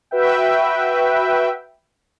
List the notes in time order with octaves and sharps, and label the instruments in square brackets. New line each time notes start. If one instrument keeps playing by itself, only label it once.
[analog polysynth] F#4 B4 E5 G5